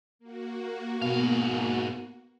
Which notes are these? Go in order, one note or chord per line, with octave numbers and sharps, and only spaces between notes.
A#3 F#4
G#2 B2 F5